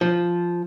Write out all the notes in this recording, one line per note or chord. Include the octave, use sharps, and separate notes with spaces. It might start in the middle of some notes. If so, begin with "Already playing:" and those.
F3